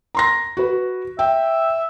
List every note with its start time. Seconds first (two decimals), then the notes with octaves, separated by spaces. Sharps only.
0.15 A#5 C6 A#6
0.57 F#4 B4
1.19 E5 G5